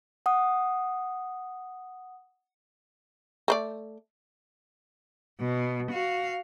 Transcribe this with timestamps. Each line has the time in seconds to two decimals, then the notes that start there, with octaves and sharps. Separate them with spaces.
0.26 F#5 D#6
3.48 A3 B4 D5
5.41 B2
5.91 F#4 F5